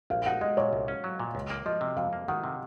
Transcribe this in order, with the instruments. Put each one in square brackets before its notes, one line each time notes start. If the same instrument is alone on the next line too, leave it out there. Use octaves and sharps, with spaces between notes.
[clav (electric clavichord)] A#1 [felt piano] F5
[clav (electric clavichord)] D#4 [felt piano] F#5
[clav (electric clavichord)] G#3 [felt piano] D#5
[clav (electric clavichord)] A#2 [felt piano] C#5
[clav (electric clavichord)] C2
C#4
F#3
A#2
C#2
A#3
[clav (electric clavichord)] F3 [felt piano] D#5
[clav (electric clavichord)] C3
[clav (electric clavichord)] F2 [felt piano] F5
[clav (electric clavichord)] A#3
[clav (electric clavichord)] D#3 [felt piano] F#5
[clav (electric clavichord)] C3